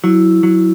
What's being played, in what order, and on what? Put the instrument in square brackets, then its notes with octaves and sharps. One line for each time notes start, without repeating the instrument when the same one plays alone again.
[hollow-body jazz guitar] F#3 [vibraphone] E4
[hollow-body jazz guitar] F#3